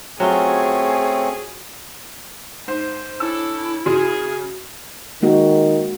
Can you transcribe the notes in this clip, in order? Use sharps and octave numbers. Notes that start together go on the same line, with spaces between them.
F#3 A3 C4 C#4 F4 G#4
G#2 C5
C#4 D4 E4 A4 E6
C#3 F#4 G#4
D#3 G#3 A#3 F#4